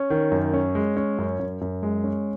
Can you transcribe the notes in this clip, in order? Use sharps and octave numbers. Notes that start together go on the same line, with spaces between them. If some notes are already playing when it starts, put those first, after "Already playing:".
Already playing: C#4
D#3
F#2
C#4
G#3
C#4
F#2
F#2
F#2
G#3
C#4